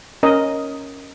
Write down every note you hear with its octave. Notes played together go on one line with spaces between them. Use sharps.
C#4 A#4 D#5